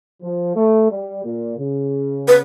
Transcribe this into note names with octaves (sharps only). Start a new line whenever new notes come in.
F3
A3
G3
A#2
C#3
B4